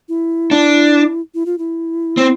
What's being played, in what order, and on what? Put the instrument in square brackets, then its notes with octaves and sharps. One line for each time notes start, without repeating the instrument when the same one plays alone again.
[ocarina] E4
[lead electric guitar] D4
[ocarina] E4
F4
E4
[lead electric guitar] C4